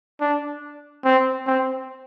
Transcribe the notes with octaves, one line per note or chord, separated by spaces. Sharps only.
D4
C4
C4